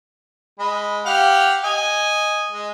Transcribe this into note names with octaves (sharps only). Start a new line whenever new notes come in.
G#3 B5
G4 F5 F#5
D#5 G#5
G#3